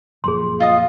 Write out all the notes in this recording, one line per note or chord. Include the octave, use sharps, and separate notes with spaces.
F#1 F2 A#2 G#4 C6
F4 D#5 F5 D#6